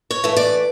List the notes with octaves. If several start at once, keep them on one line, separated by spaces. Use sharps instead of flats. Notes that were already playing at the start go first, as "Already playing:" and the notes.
C#5
E3 A3
D5